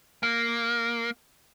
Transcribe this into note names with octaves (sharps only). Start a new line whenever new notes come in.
A#3